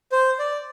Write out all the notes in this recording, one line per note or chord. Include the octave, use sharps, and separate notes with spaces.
C5
D5